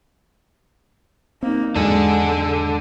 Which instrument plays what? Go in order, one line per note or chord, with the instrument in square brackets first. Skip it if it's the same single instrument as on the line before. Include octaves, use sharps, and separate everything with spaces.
[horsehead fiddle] A#3 D#4 [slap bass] C4
[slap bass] E2 G#2 F#3 [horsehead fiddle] G#3 [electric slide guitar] D4 A4